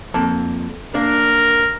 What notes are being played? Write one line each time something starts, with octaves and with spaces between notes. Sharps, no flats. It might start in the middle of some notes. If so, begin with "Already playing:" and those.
F2 A#3 A5
A#3 D4 A#4